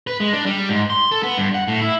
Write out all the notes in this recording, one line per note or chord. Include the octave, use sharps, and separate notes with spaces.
B4
G#3
D4
G3
G#2
C6
A4
B3
G2
F#5
A2
E4